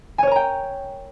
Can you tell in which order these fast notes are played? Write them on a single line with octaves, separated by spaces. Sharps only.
G#5 C#5 A#4 A#5 G5